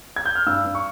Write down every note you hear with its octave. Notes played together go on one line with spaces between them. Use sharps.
G#6
G6
F6
G2 E6
G2
C#6